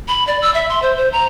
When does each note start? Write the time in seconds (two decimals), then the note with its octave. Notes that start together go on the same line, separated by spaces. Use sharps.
0.08 B5
0.27 D5
0.42 E6
0.54 E5
0.69 C6
0.82 C5
0.97 C5
1.12 A#5